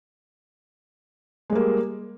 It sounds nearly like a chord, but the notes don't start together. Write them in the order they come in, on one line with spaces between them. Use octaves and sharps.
G#3 G3 A#3